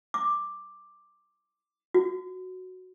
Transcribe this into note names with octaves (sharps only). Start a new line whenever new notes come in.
D6
F#4